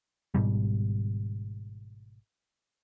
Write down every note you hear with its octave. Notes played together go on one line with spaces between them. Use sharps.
G#1 G#2 B2 G3